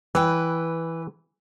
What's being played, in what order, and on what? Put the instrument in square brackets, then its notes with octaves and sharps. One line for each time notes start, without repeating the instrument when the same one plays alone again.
[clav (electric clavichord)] E3 [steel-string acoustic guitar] B4 G5